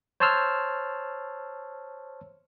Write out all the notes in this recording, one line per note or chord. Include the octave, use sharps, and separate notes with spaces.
C5 C#5 A5 C6 E6 F6